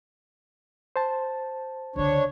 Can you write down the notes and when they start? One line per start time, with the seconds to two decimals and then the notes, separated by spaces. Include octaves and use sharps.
0.96 C5 A5
1.96 C#2 D3 D4 C#5